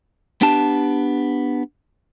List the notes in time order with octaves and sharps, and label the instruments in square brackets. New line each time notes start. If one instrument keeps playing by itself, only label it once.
[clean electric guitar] B3 D4 G4 A5